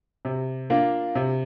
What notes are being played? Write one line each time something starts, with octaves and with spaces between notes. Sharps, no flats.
C3
A#3 D4 F4
C3